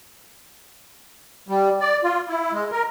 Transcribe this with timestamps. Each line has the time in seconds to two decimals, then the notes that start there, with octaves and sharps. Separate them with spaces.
1.48 G3
1.80 D5
2.04 F4
2.28 E4
2.52 G#3
2.72 A#4